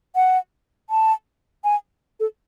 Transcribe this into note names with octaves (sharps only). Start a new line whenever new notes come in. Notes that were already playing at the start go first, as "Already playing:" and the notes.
F#5
A5
G#5
A4